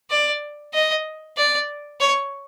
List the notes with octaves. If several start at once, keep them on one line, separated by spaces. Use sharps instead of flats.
D5
D#5
D5
C#5